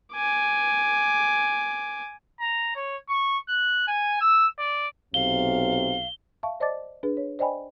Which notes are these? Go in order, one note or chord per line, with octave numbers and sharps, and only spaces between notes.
G#5 D6
A#5
C#5
C#6
F#6
G#5
E6
D5
B1 C3 F5 G7
E5 F5 A5 C#6
C5 D5 D#5 A5 D6 A6
D4 G#4 B4
C#5
C5 D5 D#5 G5 G#5 B5